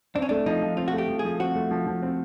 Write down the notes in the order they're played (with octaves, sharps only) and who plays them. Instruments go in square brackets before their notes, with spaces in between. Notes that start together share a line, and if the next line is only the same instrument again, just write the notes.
[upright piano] C4 [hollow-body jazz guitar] D4
[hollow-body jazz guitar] C#4
[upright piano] A3 [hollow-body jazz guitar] D4
[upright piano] F3 [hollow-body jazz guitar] D#4
[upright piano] F3
[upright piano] C4 [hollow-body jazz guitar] F4
[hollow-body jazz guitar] F#4
[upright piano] A3
[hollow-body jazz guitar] G4
[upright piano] F3
[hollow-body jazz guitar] G#4
[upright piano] F3
[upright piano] C4 [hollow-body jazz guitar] F#4
[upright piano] A3
F3
F3
C4